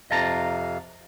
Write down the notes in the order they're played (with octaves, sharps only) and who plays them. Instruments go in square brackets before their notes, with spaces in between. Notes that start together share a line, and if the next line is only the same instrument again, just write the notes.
[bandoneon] F2 C3 F5 [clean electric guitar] D#5 A5 A#5